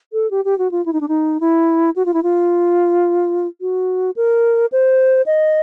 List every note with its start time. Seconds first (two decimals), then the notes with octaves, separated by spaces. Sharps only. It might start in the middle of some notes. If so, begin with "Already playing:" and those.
0.13 A4
0.31 G4
0.45 G4
0.58 F#4
0.71 F4
0.86 E4
0.93 D#4
1.01 D4
1.08 D#4
1.41 E4
1.96 F#4
2.06 F4
2.14 E4
2.23 F4
3.61 F#4
4.16 A#4
4.72 C5
5.26 D#5